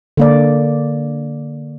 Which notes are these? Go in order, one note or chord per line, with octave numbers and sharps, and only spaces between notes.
D3 A#3 D5